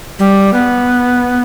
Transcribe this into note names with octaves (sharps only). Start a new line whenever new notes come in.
G3
B3